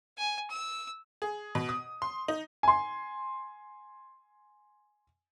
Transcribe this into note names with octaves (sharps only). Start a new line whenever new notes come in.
G#5
E6
G#4
B2
D#6
C6
D#4
G#5 C6